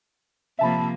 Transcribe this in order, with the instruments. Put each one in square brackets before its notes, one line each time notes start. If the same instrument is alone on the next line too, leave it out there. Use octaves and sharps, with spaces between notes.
[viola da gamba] C3 F3 A#3 [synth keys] E5 A5 B5